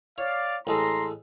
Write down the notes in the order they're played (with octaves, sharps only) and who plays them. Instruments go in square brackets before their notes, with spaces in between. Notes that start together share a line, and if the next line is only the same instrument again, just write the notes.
[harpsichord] C#5 [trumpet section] D5 F5
[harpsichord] A1 G#3 A4 [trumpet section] A#5 C6